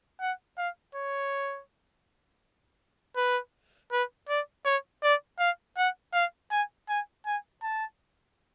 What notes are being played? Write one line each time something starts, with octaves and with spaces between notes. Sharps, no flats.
F#5
F5
C#5
B4
B4
D5
C#5
D5
F5
F#5
F5
G#5
G#5
G#5
A5